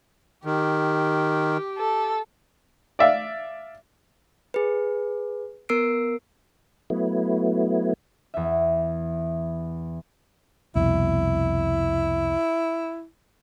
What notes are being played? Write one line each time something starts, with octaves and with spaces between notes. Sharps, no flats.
D#3 G4
A4
D5 E5 F5
G#4 B4
B3 A#4 E6 C7 D7
F#3 A3 B3 E4
E2 E5
C2 F2 B2 E4